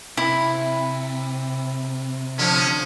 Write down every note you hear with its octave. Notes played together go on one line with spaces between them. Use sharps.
C3 E4
D3 F3 C#4